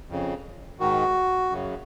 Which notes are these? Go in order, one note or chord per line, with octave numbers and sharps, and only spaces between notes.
F2 C#3
G#2 D#3 F#4
F#2 C#3